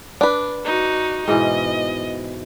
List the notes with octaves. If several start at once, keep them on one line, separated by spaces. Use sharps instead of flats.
D4 B4
D#4 F#4
G#2 B2 E3 D#5